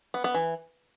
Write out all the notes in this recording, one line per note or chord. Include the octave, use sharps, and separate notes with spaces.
B3
B3
E3